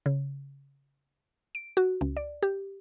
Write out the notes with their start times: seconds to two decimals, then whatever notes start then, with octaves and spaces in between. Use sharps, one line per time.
0.06 C#3
1.55 D7
1.77 F#4
2.01 C#2
2.17 D5
2.43 G4